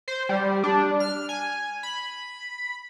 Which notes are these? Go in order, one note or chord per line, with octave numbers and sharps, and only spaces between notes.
C5
G3
D4
F6
G#5
B5